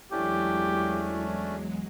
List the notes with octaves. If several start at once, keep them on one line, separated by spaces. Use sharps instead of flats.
E2 F#3 G#3 A3 C#4 D4 E4 G4